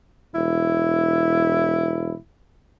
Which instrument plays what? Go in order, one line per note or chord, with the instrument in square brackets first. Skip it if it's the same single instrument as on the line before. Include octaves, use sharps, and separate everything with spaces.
[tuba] E1 [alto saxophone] E4